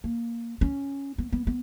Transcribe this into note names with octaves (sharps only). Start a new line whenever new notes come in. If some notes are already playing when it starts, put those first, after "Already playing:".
A#3
C#4
B3
B3
B3